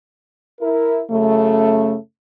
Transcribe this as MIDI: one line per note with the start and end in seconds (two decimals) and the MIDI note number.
0.61 1.00 64
0.61 1.00 70
1.10 1.94 42
1.10 1.94 49
1.10 1.94 57